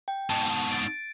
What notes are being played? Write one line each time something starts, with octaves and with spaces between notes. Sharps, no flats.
G5
G#2 B2 A5
A6 D7